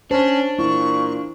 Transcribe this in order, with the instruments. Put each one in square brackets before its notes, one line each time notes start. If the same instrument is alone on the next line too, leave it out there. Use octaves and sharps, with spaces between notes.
[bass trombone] C#4 [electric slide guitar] D4 [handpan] C5 [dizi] A5
[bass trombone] A#2 [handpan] E4 [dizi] C#6